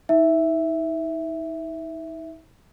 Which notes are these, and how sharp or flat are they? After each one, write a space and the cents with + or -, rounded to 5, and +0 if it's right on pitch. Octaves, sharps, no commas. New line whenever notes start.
D#4 +40 E5 +0